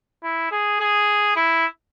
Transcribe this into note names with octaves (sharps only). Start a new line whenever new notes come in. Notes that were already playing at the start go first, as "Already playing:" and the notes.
E4
G#4
G#4
E4